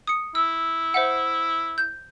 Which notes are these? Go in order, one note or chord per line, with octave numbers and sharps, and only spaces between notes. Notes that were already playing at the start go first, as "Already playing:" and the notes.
D#6 C#7
E4 E6
C5 E5 F#5
G6